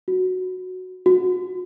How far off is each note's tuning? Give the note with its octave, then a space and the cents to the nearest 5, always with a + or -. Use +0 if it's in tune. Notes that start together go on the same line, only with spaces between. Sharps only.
F#4 -5
F#4 -25